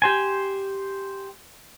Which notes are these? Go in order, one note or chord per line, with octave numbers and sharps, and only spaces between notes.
G4 C5 G#5